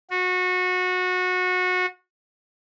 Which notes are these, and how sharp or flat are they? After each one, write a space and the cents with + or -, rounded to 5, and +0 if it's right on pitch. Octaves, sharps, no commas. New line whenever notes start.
F#4 -25